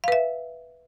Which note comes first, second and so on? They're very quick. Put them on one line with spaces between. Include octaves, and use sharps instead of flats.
F5 B4 E5